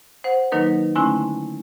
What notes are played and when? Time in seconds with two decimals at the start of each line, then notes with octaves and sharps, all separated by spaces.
0.24 C5 F#5
0.52 D#3 F#3 A#3 D#4 A#4 B4
0.95 D3 A3 C#4 E4 G#5 C6